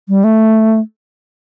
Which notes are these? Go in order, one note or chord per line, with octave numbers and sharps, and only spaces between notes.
G3
A3